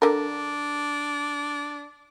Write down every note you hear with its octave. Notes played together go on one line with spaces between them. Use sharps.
D3 D4 A#4